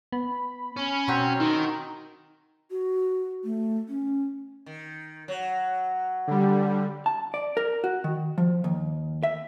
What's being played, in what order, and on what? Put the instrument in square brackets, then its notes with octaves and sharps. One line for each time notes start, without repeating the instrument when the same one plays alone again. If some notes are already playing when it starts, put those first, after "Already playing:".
[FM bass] B3 [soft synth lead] B5
[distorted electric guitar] C#4
[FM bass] B2 [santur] F#3 C4 B4
[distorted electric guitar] D#3 [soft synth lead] D#4
[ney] F#4
A3
C#4
[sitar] D#3
F#3
[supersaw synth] D3 G3
[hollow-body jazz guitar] A5
D5
A#4
F#4
D#3
F3
D#2
E5